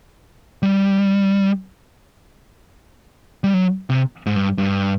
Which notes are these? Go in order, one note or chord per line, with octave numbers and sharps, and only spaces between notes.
G3
G3
F#3
C3
G#2
G2
G2